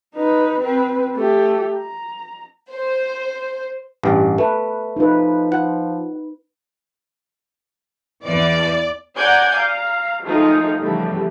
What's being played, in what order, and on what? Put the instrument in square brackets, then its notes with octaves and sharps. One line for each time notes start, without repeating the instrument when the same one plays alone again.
[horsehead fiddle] D#4 B4
C4 B4
A3 G4
A#5
[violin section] C5
[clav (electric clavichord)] A1 G2
[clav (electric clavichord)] A3 [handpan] B4
[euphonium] F3 [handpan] D#4 B4
[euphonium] F3 [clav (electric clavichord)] F#5
[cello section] E2 E3 [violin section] D5
[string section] D5 F#5 G#5 A#5 G6 G#6
F5 A#5
D#3 F3 G#3 A3 D#4 F4
C#3 E3 F3 G3 A3 B3